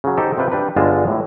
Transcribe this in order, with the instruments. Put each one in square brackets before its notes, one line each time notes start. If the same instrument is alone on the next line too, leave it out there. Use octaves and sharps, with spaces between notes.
[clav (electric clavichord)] C#3 F#3
D#4 G4 A4 C5
C3 F4 B4 G5
G3 D4 B4
G1 D3 G#3 F4 A5
A2 E3